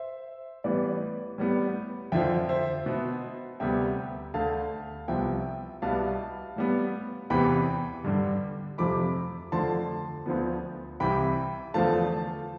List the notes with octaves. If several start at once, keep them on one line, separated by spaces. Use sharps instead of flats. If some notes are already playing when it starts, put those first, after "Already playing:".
Already playing: C5 E5
A2 E3 G3 B3 B4 D5
A2 G3 B3
F2 D3 F3 E5 G5
C5 E5
B2 B3
D2 C3 G3 B3 E5 G5
D2 D3 A3 F5 A5
C2 C3 F3 B3 E5 G5
C2 B2 G3 B3 F5 A5
A2 G3 B3
E2 C3 E3 B3 G5 B5
G2 D3 G3
F2 C3 F3 A3 B5 D6
F2 D3 F3 A3 A5 C6
D2 D3 F3 B3
C2 C3 E3 G5 B5
E2 D3 F3 A3 F5 A5